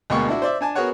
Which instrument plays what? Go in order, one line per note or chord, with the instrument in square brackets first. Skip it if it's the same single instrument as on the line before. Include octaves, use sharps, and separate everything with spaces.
[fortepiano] D2 B2 G#3 A#3 G5 C#6
D4 E4 F#4
C5 D5 E5
D4 G#5 A5
B3 F#4 G#4 A#4 C#5 F#5